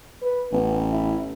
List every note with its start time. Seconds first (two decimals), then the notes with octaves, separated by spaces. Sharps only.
0.22 B4
0.52 A1 B3
0.90 E4